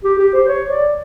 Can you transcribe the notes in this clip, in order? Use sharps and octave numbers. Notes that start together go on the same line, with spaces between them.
G4
G4
C5
C#5
D5